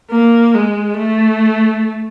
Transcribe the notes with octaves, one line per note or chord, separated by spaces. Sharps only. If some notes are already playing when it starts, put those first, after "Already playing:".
A#3
G#3
A3